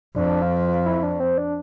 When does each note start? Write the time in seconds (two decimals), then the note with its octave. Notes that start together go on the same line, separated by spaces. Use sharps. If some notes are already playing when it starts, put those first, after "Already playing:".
0.16 F2 D4
0.42 F4
0.68 F4
0.86 E4
1.03 D4
1.20 C4
1.38 D4